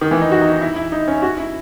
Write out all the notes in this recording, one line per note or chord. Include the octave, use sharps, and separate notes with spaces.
D#3
E3
D#4
F#4
D#4
D#4
E4
E4
D#4
C#4
F#4
E4